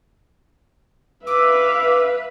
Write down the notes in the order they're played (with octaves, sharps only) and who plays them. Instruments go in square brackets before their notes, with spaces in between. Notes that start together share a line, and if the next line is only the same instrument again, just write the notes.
[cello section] B4 [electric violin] E5 F5 [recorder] D6 [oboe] E6